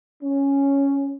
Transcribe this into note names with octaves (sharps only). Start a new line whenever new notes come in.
C#4